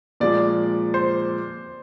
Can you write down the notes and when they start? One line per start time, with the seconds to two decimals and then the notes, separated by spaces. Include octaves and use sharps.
0.20 A#2 F3 G#3 D5
0.94 C5